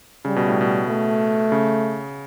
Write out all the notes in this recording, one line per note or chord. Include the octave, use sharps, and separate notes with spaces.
C#3 G3
B2
A2
B2
A3
C#3